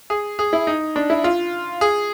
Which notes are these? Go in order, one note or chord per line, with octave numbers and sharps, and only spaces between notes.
G#4
G#4
E4
D#4
D4
E4
F4
G#4